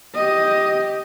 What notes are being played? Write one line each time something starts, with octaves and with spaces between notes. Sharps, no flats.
G4 D#5